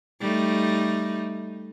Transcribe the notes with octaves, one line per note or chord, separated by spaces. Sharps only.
G3 A3 D#4